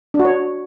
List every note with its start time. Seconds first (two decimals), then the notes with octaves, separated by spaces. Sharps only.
0.14 D4
0.20 F#4
0.25 C#5